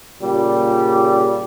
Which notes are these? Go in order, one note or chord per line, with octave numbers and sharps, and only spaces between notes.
A#2 C#3 G3